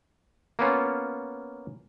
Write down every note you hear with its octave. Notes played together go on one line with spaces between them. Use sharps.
A#3 B3 C#4 F4